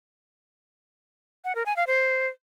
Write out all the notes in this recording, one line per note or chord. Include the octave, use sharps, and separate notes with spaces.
F#5
A#4
G#5
F5
C5